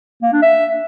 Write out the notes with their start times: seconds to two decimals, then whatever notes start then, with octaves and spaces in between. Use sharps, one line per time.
0.22 A#3
0.32 D4
0.42 E5